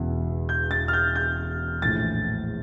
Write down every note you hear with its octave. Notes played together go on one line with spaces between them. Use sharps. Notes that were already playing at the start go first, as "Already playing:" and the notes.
Already playing: E1 E2 C#3 E3
G6
A6
F6
G6
G6
A#1 A2 E3 A6